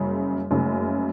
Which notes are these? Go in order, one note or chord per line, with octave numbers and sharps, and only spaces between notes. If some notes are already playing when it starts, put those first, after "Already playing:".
Already playing: F#1 F#2 C#3 G3
F#1 F#2 C#3 A3